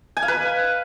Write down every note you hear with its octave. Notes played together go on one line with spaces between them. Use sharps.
G#5
F5
B4